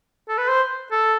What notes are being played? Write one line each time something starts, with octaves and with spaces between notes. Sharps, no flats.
A4
B4
C5
A4